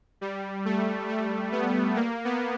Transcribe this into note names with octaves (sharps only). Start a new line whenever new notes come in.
G3
A3
A3
B3
A#3
B3